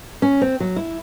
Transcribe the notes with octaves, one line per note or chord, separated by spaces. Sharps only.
C#4
C4
F#3
E4